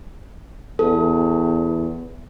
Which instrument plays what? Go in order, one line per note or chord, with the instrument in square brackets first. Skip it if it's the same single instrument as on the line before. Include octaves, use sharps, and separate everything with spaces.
[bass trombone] E2 [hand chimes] A4